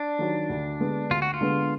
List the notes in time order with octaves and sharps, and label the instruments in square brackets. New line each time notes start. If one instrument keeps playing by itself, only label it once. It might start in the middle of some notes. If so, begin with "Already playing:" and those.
Already playing: [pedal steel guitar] D4
[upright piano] D#3 F#3
D2
D3 G#3 B3
[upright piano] D2 [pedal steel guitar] F4
[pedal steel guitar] F#4
F4
[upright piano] D3 G#3 B3